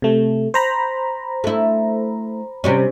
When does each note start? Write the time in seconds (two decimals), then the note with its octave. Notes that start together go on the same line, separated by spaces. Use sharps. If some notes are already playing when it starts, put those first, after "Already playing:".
0.02 C3 A3
0.54 C5 A#5 B5
1.44 A3 E4
2.64 C3 G3 C#4